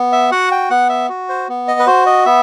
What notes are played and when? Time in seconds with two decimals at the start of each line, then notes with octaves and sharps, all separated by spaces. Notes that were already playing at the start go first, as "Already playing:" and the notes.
Already playing: B3
0.12 E5
0.32 F#4 F#5
0.52 G5
0.70 B3 F#5
0.89 E5
1.09 F#4
1.29 C5
1.49 B3
1.68 D#5
1.80 B4
1.87 F#4 C5
2.06 D#5
2.26 B3 E5